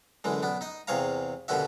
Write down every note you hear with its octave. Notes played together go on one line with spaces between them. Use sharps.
F#2 D3 E3 G#3
B1 B3 D4
D#4 D#5
E2 C3 G#4 C#5 F5 A#5
D#2 B2 D3 C#4 F#4 E5